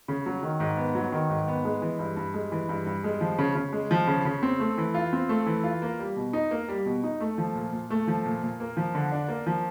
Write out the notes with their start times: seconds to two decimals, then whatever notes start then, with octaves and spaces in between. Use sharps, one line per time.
0.08 C#3
0.26 F#3
0.43 D#3
0.60 G#2
0.77 B3
0.95 F#3
1.12 D#3
1.30 G#2
1.48 B3
1.65 G#3
1.82 E3
1.99 G2
2.17 G2
2.34 G#3
2.52 E3
2.69 G2
2.86 G2
3.04 G#3
3.21 F3
3.38 C#3
3.55 C#3
3.72 G#3
3.91 F3
4.07 C#3
4.25 C#3
4.43 C4
4.60 A3
4.78 E3
4.94 F4
5.13 C4
5.29 A3
5.46 E3
5.64 F4
5.82 A#3
5.99 G3
6.16 B2
6.33 D#4
6.51 A#3
6.68 G3
6.86 B2
7.04 D#4
7.20 A3
7.38 F3
7.55 A#2
7.72 A#2
7.90 A3
8.08 F3
8.25 A#2
8.43 A#2
8.60 A#3
8.77 F3
8.95 D3
9.12 D4
9.29 A#3
9.46 F3